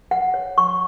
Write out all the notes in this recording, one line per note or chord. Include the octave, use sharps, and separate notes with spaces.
F#5
C#5
C#6